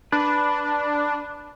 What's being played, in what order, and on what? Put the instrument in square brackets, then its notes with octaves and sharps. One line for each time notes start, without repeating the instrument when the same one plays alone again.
[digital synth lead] D4 [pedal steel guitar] B4